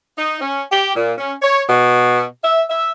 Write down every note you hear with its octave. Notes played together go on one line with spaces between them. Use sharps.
D#4
C#4
G4
A#2
C#4
C#5
B2
E5
E5